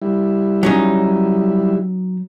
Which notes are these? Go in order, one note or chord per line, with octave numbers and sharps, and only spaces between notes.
G3 E4
F#3 C#4 D#4